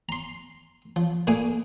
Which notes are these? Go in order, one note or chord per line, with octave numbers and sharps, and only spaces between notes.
A#5 C6
F3
A#2 A3 A#3 G#4 G#5